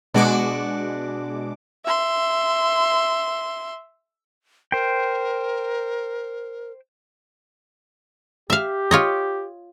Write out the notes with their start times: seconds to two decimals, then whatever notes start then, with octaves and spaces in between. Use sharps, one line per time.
0.14 B2 G#3 D4 F#4 D6
1.86 E5 C6
4.72 A#4 C5 G5
8.50 G4 E5 F5
8.91 F4 C#5 D#5